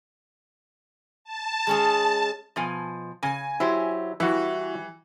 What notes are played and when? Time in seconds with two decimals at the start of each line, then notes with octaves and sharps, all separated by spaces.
1.24 A5
1.67 G#3 C#4 G#4
2.56 B2 F3 G#5
3.23 C#3 G#5
3.60 F#3 E4 G4 C5
4.20 E3 G3 E4 F#4